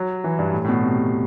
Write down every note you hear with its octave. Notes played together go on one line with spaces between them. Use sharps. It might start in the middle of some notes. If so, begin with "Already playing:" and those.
Already playing: F#3
E3
G2
A2
A2
B2
C3